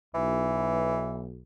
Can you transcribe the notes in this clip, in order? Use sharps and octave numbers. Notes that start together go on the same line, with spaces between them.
B1 E3